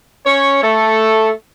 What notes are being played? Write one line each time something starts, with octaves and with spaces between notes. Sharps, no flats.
C#4 C#5
A3 A4